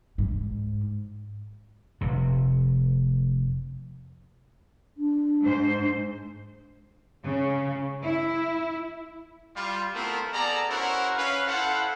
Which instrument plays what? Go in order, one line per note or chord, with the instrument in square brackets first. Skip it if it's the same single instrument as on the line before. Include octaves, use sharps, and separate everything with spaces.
[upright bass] G#2
[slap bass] F1 C3
[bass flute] D4
[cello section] G#2 C5
C#3
E4
[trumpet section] G3 F4
A3 B3 C4 E4 F4 A#4
B3 G#4 A4 D5 A#5
C#4 E4 F#4 A#4 C5 F#5
C#4 B4 F5
E4 A4 C5 F5 F#5